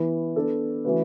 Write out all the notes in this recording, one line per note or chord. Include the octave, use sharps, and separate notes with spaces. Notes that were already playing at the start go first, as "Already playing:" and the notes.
Already playing: E3 B3 E4 B4
B3 D4 A4 D5
E3 A3 C#4 F#4 B4